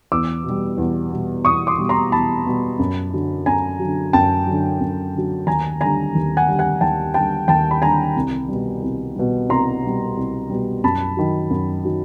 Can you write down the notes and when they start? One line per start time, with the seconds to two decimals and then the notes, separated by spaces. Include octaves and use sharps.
0.12 E2 D6 E6
0.44 B2
0.49 G3
0.78 E2
1.12 B2 G3
1.45 E2 C#6 D#6
1.67 C6 D6
1.78 B2 G3
1.89 A#5 C6
2.12 E2 A5 B5
2.46 B2 G3
2.79 F#2
3.13 D3 F#3
3.46 F#2 G#5 A#5
3.79 F#3
3.84 D3
4.13 F#2 G5 A5
4.47 D3 F#3
4.80 F#2
5.14 D3 F#3
5.47 D#2 G#5 A#5
5.81 D3 G3 G#5 A#5
6.15 D#2
6.37 F#5 G#5
6.48 D3 G3
6.59 F#5 G#5
6.81 D#2 G5 A5
7.14 D3 G3 G5 A5
7.48 D#2 G5 A5
7.71 B5
7.82 D3 G3 G#5 A#5
8.16 C2
8.49 B2 G3
8.82 C2
9.15 B2 G3
9.49 C2 A#5 C6
9.83 B2 G3
10.17 C2
10.50 B2 G3
10.84 F#2 A5 B5
11.17 D#3 F#3
11.50 F#2
11.85 D#3 F#3